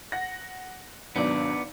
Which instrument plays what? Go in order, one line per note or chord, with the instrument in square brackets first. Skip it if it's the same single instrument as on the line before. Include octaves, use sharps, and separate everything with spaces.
[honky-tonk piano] F#5 A#6
[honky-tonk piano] G#1 B2 F#3 [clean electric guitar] B3 D5 [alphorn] D4